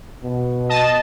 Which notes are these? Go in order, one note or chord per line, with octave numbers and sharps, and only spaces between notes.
B2
D#5 A5